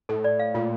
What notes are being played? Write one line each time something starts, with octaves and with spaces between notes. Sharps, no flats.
A2 A4
D5
F5
A#2 F4